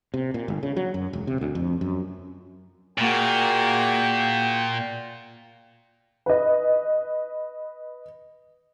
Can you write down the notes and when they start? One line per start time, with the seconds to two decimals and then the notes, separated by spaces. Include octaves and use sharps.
0.14 C3
0.34 A#2
0.48 G1
0.63 C#3
0.76 F#3
0.94 F#2
1.13 E1
1.27 C3
1.41 D2
1.55 F2
1.81 F#2
2.98 A#2 A#3 F#4 G#4 G5
6.26 B4 D#5